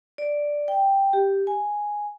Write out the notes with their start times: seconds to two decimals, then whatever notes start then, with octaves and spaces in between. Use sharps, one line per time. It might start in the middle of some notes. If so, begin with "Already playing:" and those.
0.18 D5
0.68 G5
1.13 G4
1.47 G#5